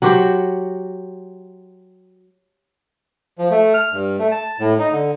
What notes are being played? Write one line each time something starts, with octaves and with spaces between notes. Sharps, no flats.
F#3 F#4 G4 C5
F3
A3
F6
G2
A3
A5
A2
D#4
D3